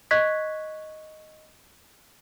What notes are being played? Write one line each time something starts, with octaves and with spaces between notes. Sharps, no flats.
D#5 C#6 F#6 G#6 B6